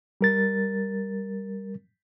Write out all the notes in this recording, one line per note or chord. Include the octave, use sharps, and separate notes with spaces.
G3 A#4 A6